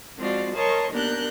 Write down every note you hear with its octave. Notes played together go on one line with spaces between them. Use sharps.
F3 G#3 C4 F4 F#4 D5
A#4 C#5 D#5 A5 C6 C#6
D#2 B3 D4 A#4 F#6 G6